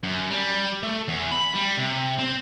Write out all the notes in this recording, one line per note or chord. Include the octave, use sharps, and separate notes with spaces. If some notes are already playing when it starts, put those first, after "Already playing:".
F#2
G3
A3
E2
B5
G3
C3
C4